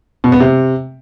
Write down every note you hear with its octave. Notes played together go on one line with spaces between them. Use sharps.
B2
B3
C3